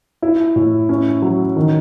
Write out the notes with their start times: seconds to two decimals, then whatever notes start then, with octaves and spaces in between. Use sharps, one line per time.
0.22 E4
0.56 A2
0.89 C#4
1.22 F#3
1.56 D#3